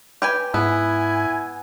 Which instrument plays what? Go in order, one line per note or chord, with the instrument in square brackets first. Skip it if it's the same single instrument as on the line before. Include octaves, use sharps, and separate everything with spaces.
[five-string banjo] G4 B4 G#5
[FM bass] G#2 [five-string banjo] B3 [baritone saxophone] E4 [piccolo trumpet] G#5